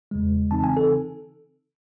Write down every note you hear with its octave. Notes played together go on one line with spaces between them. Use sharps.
E2 C#3 G#3
C#3 E3 C4 D#4 A5
G#5
A4